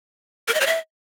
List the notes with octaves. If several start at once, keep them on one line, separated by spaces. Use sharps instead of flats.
A#4
D#5
C#5
E5